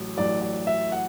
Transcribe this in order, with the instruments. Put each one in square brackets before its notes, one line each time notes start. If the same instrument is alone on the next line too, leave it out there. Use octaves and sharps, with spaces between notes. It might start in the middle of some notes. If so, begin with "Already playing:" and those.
Already playing: [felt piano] A1 A2 F#3
[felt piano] A1 A2 F#3 [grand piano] D5
[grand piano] D5
E5
F#5